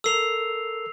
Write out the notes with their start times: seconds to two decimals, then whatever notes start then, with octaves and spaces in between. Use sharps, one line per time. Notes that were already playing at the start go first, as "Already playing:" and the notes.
0.04 A4 A#4 E6 C7 F7